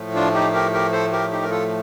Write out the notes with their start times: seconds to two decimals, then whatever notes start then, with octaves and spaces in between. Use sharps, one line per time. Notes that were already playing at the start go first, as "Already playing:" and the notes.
Already playing: A2 F3 A3
0.15 D4 F4
0.34 D#4 G4
0.53 G4 A#4
0.73 G4 A#4
0.92 A4 C5
1.12 G4 A#4
1.31 D#4 G4
1.43 A#4
1.50 F4 A4